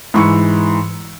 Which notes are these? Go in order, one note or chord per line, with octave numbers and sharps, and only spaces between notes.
G#2 E3 B5 C#6 E6 C#7